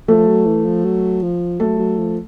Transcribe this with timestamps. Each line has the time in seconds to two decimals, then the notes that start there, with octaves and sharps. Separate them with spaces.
0.08 F3 A3 A4
0.28 F#3
0.46 E3
0.65 F3
0.85 F#3
1.23 F3
1.60 F#3 A3 A4
1.79 F#3
1.99 F3